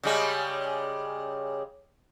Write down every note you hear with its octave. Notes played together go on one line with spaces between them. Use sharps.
C#3 G3 G#3